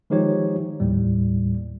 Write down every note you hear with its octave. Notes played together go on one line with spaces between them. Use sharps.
D#3 F3 G#3 D#4 G4 C#5
D#2 A2 G3